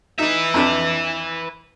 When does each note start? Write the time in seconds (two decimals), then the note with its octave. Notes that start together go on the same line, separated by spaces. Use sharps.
0.19 D#4 B4 E5
0.54 F2 D4